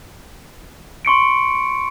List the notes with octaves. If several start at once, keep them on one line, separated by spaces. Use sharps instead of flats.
C6 C#6 C#7 D7